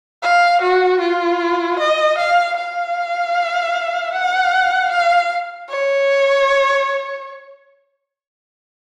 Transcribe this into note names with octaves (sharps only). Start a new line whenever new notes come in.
F5
F#4
F4
D#5
F5
F5
F#5
F5
C#5